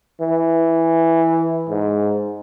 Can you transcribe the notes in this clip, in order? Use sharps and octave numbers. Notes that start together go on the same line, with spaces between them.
E3
G#2